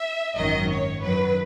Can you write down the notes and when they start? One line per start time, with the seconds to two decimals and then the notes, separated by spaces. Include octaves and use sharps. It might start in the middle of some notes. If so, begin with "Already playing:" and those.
Already playing: E5
0.36 G#1 F#2 D#3 F#3 D#5
0.69 C#5
1.03 F#2 D#3 F#3 B4